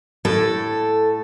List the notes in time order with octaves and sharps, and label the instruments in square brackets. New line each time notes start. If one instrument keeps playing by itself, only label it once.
[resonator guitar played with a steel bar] A2 [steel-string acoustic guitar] A4